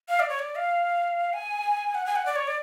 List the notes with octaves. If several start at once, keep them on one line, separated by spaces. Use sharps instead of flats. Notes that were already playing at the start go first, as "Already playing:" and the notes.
F5
D5
C#5
D5
F5
G#5
F#5
G#5
F#5
D5
C#5
D5